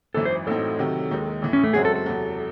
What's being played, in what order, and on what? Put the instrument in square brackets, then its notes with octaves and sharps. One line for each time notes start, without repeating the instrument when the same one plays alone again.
[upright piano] G#1 F#2 E3 [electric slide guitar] A4
[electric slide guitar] C5
[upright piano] A1 A2 F#3 C4 D#4 [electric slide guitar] A4
[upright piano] C3 D#3 F#3
D#2 D#3 G#3 D#4
A1 A2 E3
[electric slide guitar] C#4
A3
[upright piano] F#2 C#3 G#3 C4 F#4 [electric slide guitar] G#4
[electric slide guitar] A4
A4
[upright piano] E2 C3 F#3